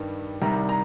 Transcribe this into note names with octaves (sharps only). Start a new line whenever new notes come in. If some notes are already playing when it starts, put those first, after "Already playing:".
Already playing: G2 D#3 G3
C2 C3 D#3 G3 A#5
A#5